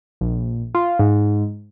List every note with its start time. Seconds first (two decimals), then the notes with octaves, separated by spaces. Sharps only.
0.21 A#1
0.75 F4
0.99 G#2